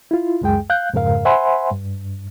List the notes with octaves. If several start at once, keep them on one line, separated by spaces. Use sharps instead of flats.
E4 F4
C#2 F#2 G#3 G#4 G5
F5 F#6 G6
F2 G#2 C#3 A#4 F5
C5 E5 F#5 G#5 B5 C6
G2